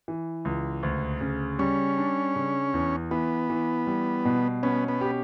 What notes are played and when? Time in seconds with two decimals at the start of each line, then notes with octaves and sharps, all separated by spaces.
0.08 E3
0.45 C#2
0.83 D2
1.21 C#3
1.59 G3 C#4
1.98 D4
2.36 C#3
2.74 E2
3.11 E3 B3
3.50 E3
3.87 G3
4.25 B2
4.63 B3 C#4
4.88 B3
5.01 G4